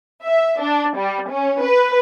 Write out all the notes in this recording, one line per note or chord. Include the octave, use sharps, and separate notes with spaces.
E5
D4
G3
C#4
B4